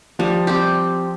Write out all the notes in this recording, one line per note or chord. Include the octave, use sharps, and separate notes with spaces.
F3 G3
C4 G4